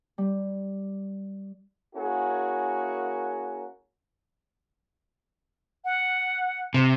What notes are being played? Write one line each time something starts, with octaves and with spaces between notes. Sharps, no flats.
G3
A#3 C#4 E4 F#4 G#4 A#4
F#5
C3